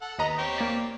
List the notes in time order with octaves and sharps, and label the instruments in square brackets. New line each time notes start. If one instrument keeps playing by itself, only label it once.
[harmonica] A4 F#5
[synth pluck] D#2 D#5 A#5 [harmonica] B3
[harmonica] C4 G4 C#5
[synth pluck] A#3 D5